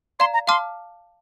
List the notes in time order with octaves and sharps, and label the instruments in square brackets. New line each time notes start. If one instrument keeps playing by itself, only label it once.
[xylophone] D5 F5 A#5 [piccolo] C6
[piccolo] A#5
[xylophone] F5 A5 D6 F6 [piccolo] C6